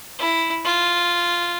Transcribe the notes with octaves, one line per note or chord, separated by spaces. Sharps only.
E4
F4